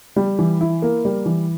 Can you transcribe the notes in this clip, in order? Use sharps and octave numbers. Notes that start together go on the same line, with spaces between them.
G3
E3
E4
A#3
G3
E3